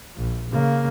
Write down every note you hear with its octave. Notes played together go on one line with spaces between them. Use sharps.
A#1
C#3 A#3